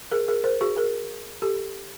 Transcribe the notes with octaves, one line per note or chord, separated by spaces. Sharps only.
G#4 A#4
G#4 A#4
A#4 C5
F#4 G#4
G#4 A#4
G4 A4